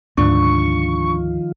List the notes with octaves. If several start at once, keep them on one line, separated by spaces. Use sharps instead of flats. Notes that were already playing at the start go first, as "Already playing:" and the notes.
D2 G#2 D#3 F3 D4 F4 C#6